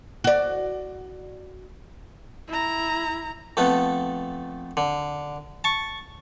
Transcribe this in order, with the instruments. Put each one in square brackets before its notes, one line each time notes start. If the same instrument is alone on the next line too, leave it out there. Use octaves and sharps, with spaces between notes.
[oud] F#4 D5
[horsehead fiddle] E4 A#5
[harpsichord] F2 A3 B3
D3
A5 C#6